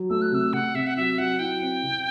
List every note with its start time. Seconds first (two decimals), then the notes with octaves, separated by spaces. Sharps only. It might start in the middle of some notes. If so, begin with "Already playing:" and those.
Already playing: F#3
0.10 A3 E6
0.22 F#6
0.32 C3 E6
0.53 C3 F#5
0.74 C3 E5
0.87 F#5
0.96 F#3 E5
1.18 F#3 F#5
1.39 E4 G5
1.61 C4
1.83 C3